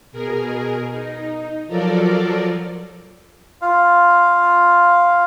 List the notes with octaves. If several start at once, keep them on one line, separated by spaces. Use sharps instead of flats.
B2 G#4 A#4
D#4
F3 F#3 F4 A4 A#4 D5
F4 F5